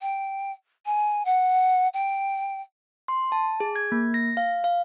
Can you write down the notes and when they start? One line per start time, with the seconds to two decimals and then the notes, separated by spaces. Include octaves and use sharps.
0.01 G5
0.86 G#5
1.25 F#5
1.94 G5
3.08 C6
3.32 A5
3.60 G#4
3.76 G#6
3.92 A#3
4.14 A#6
4.37 F5
4.64 F5